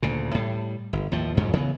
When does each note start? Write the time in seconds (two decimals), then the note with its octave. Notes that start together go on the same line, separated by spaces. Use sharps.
0.03 D2 A#2 C#3
0.35 A2 G3
0.93 G1
1.12 D#2 A2 F3
1.37 F2 G#2 D3 F#3
1.53 C#3 E3 G#3 B3